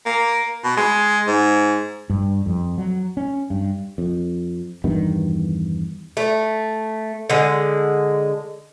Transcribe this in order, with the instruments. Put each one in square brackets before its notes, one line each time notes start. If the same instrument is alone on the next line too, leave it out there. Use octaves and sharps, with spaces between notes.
[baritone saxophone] A#3
B2
G#3
G#2
[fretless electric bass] G2
F2
F#3
C#4
G2
F2
E2 G2 D#3 B3
[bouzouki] A3
D3 G#3